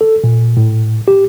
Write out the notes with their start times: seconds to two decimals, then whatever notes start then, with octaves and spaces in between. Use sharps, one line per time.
0.01 A4
0.24 A#2
0.57 A2
1.08 G4